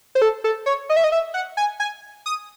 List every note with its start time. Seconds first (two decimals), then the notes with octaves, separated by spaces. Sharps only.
0.15 C5
0.22 A4
0.44 A4
0.66 C#5
0.89 D#5
0.97 E5
1.04 D#5
1.12 E5
1.34 F#5
1.57 G#5
1.80 G#5
2.26 D#6